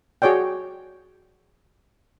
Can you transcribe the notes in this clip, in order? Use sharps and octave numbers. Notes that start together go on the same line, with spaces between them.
F#4 G#4 C#5 D5 G5